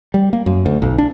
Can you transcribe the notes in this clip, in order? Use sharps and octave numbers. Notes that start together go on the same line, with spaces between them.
G3
A#3
F#2
D2
B1
D4